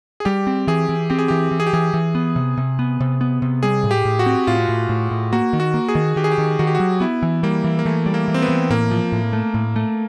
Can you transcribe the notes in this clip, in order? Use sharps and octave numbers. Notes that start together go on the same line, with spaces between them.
G#4
G3 G4
C4
E3 G#4
E3
C4 G4
G#4
E3 G4
E3
G#4
G4
E3 G#4
E3
B3
C3
C3
B3
C3
B3
C3
G3 G#4
A2
G4
A2
F#4
C4
A2 F4
A2
A2
A2
A#3 F#4
D#3
F#4
A#3
G#4
D#3
D#3 G4
G#4
G4
D#3
D#3 F#4
G4
F#4
F#3
B3 E4
E3
G3 A#3
E3
A#3
E3 A3
G3
A#3
E3
C4
B3
E3
A2 A#3
F3
A2
A3
A2
A3